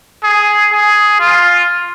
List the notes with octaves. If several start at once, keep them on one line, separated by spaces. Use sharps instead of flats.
G#4
G#4
F4